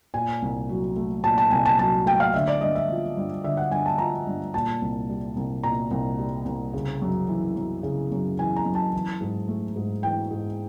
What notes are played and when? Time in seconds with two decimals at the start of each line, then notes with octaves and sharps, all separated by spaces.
0.14 A#2 G#5
0.42 C2
0.69 F#3
0.96 A3
1.24 A#2 A5
1.38 A5
1.51 C2 G#5
1.66 A5
1.79 F#3 A5
2.06 A3 G5
2.20 F5
2.33 D3 E5
2.48 D5
2.61 G2 D#5
2.75 E5
2.90 F3
3.17 G2
3.43 D3 E5
3.57 F#5
3.71 G2 G#5
3.86 A5
3.98 F3 A#5
4.27 G2
4.54 A#2 A5
4.81 C2
5.09 G3
5.36 C2
5.63 A#2 A#5
5.91 C2
6.19 G3
6.46 C2
6.73 C#3
7.02 F#2
7.28 E3
7.56 F#2
7.83 C#3
8.11 F#2
8.39 E3 G#5
8.56 A#5
8.65 F#2
8.75 A5
8.93 E3
9.21 G#2
9.48 A3
9.76 G#2
10.03 E3 G5
10.31 G#2